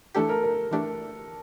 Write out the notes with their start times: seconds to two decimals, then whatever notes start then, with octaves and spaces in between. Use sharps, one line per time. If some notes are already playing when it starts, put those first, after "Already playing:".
0.15 E3 A3 D4 G4 A4
0.29 A#4
0.44 A#4
0.71 E3 A3 D4 G4